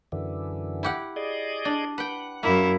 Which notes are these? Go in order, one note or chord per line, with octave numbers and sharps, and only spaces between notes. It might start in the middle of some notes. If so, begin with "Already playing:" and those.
F#2 D3 E3
E4 G4 F#5
G#4 D5 D#5
D4
B4 F#5 G5
F#2 A#3 E4